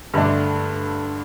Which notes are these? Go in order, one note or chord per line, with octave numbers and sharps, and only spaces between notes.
G2 D3 A3 D4